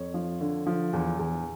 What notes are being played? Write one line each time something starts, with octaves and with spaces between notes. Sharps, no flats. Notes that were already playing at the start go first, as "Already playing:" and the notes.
Already playing: F2 C#5
F3
D3
F3
E2
E2